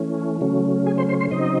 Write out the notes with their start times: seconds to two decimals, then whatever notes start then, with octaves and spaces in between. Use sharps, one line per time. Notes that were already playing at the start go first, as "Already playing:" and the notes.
Already playing: E3 A3 C#4
0.41 C#3 F#3 A3 C#4
0.86 G#4 G#5
0.98 C5 C6
1.09 C5 C6
1.20 C5 C6
1.31 C#3 F#3 C4 D#4 D#5